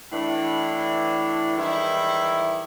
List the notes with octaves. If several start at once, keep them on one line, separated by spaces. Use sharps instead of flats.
A2 E3 D4
D#3 E3 G3 G#3 E4